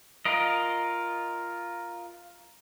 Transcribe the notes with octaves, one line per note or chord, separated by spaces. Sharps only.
F4 A#4 D#5